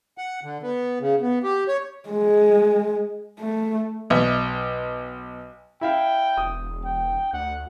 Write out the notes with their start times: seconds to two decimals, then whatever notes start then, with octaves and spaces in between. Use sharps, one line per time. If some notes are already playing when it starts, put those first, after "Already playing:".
0.18 F#5
0.44 D3
0.63 B3
1.01 C#3
1.21 B3
1.43 G4
1.68 C#5
2.09 G#3
3.39 A3
4.10 B1
5.81 E4 E5 F5 G5
6.37 E1 D#6
6.84 G5
7.33 D2 F#5